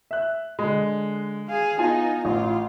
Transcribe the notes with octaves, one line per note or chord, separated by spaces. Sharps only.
E5 F#6
D3 G#3
G#4 F5
B3 D#4 F4 G#5
A1 F4